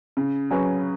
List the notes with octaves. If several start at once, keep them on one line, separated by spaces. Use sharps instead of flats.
C#3
F#3 C#4 G#4 B4